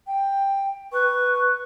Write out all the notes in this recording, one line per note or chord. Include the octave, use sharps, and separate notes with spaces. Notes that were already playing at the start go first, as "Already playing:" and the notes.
G5
B4 C#6